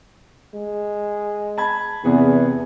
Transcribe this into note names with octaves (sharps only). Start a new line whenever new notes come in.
G#3
A5 B5 G#6
E2 C3 B3 G#4